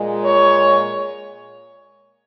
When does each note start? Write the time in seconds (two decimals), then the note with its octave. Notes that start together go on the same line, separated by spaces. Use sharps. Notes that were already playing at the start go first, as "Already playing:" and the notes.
Already playing: A#2 G#3
0.24 C#5